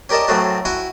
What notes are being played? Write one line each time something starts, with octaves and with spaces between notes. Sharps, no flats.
C#4 G4 A#4 D5 D#5 A5
A2 F#3 A3 C4 C#4 F#4
E4 F#4 G5 G#5 C#6